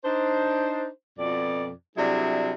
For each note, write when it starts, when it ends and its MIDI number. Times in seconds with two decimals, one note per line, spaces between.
0.04 0.86 62
0.04 0.86 63
0.04 0.86 72
1.18 1.69 41
1.18 1.69 47
1.18 1.69 74
1.96 2.52 48
1.96 2.52 54
1.96 2.52 55
1.96 2.52 62
1.96 2.52 64
1.96 2.52 68